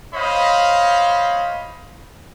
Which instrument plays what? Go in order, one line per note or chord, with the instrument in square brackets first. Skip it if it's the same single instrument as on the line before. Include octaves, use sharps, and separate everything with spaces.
[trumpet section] C5 C#5 D#5 F5 B5